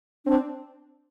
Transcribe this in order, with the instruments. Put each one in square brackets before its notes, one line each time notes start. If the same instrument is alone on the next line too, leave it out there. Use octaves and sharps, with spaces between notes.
[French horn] C4 [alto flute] D4